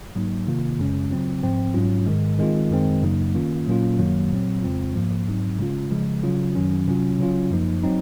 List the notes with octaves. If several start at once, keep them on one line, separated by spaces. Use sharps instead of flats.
G#2 F#3 A#3 D#4
C3 D#3 A#3 F4
F#2 C#3 G#3 C#4
C#3 F#3 C4 F4
G#2 F3 C4
G#2 F#3 C#4 F4
G#2 D#3 G#3
D#3 G#3 C4 F4
F#2 D#3 G#3 C4
F#2 C#3 F#3 A#3 D#4
D#3 A#3 C#4 F4
A#2 F#3 A#3 C#4 F4
F#2 D#3 F#3 A#3
A#2 F#3 C4
F2 C#3 G#3 C4 F4
G#2 F3 A#3
G#2 F#3 C4 D#4
C#3 G#3 C#4 F4
C#3 F3 G#3
C#3 F#3 C#4 F4
F#2 D#3 F#3 C#4
C3 F#3 C#4 F4
C#3 F#3 C#4 F4
F#2 F3 A#3 D#4
F#3 C4 D#4